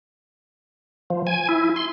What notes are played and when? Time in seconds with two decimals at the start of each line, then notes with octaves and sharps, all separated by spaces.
1.10 F3
1.27 G#5
1.49 E4
1.76 C6